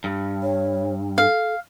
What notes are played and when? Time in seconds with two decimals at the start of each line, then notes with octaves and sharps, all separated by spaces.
0.04 G2
0.43 C#5
1.18 A4 F5